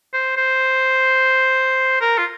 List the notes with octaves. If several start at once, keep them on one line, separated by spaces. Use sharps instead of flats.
C5
C5
A#4
F4